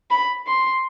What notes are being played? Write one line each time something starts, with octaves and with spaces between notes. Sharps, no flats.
B5
C6